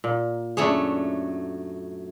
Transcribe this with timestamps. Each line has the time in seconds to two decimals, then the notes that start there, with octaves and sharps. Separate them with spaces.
0.04 A#2
0.57 F#2 A3 D4 E4 G#4 C#5